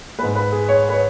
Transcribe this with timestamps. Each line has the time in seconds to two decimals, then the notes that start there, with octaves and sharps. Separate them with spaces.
0.18 G#3 B4
0.23 G#2
0.35 B4
0.52 G#4
0.68 C#5
0.89 B4
0.93 C#5